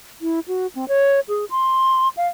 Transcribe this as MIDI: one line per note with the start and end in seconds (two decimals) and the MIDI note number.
0.21 0.40 64
0.48 0.67 66
0.75 0.88 60
0.88 1.20 73
1.28 1.45 68
1.50 2.08 84
2.17 2.27 77